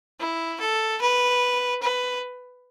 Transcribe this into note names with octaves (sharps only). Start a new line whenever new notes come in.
E4
A4
B4
B4